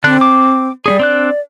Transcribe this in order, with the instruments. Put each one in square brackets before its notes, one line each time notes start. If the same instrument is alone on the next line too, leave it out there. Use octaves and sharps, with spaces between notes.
[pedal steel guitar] D3 D4 F#6 [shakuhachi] C4
[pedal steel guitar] D6
[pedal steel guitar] G3 C#4 G#4 [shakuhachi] D5
[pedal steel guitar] C4 D4 F#6